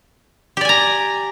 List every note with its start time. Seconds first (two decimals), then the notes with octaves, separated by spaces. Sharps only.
0.57 G4
0.61 D5
0.65 G#5
0.69 A#5